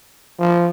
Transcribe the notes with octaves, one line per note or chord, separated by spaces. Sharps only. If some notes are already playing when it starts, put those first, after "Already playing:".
F3